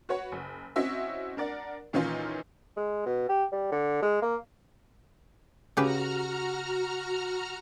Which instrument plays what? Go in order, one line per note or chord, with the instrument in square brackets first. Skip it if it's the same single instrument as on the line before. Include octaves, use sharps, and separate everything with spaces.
[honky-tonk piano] F#4 B4 C#5 F#5
F#1
C4 C#4 E4 F#4 D#5 E5
D4 A#4 D5 F#5
A#2 D#3 E3 C#4 D#4 F4
[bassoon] G#3
B2
G4
G3
D3
G#3
A#3
[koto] C#3 G4 B4 [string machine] F#4 A#5 F6